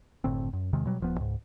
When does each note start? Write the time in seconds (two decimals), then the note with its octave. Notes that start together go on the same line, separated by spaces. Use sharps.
0.24 F#1 A2 D3 C4
0.53 F#2
0.73 E2 C3 D#3 G#3
0.86 B2 F#3 G3
1.00 D#1 F3 B3
1.18 C#2 G#2